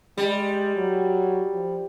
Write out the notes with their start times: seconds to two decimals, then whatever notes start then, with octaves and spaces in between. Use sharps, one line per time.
0.18 G3 G#3
0.77 F#3
1.54 F3